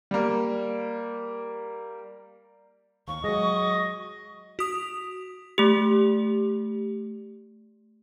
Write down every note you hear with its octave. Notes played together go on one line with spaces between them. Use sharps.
G3 A#3
D#2 C#6
F#3 G#3 D#5
F#4 D#6 F7
A3 G4